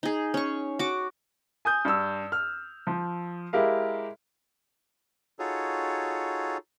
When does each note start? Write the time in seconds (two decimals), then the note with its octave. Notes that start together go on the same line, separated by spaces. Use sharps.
0.03 D#4 G#4
0.34 C#4 C#6
0.79 F#4 D6
1.65 G#5 D#6 G6
1.85 G2 E6
2.32 F6
2.87 F3
3.53 G#3 E4 G4 A#4 F5
5.39 D#4 F4 F#4 G#4 A4 C#5